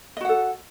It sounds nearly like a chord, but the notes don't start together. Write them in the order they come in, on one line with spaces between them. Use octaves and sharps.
D#5 F#4 F#5 A4